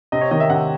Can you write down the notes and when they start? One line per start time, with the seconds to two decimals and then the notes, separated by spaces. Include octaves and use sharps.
0.12 C3 D#5
0.21 C#5
0.31 D#3 D#5
0.40 E5
0.50 C3 F#5